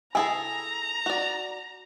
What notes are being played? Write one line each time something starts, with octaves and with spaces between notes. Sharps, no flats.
E4 G#4 A4 G#5 A#5
F#4 D5